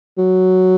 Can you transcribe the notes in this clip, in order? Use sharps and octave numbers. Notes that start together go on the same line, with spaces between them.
F#3